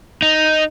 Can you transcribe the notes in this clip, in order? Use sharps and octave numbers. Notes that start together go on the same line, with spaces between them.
D#4